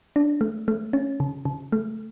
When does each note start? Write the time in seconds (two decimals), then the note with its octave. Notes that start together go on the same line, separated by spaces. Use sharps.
0.16 D4
0.41 A3
0.68 A3
0.93 C#4
1.20 C#3
1.45 C#3
1.72 A3